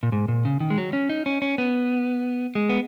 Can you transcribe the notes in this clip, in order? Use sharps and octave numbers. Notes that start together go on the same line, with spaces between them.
A#2
G#2
A#2
C#3
D#3
G#3
F#3
C#4
D#4
C#4
C#4
B3
G#3
B3